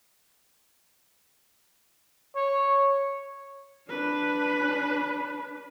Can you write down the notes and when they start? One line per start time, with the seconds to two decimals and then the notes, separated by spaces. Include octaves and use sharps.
2.36 C#5
3.88 D4 B4